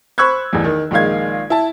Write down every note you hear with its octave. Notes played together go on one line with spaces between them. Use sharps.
C5 B5 C#6 E6 F#6 G#6
A1 E2
D#3
A#1 D#3 G#3 F5 G#6
E4 A5